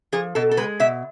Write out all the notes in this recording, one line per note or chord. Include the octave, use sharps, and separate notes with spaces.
F3 G#4
B2 A4
A4
G#3 B4
B2 E5